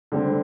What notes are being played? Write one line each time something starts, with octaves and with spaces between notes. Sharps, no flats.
D3 G3 C4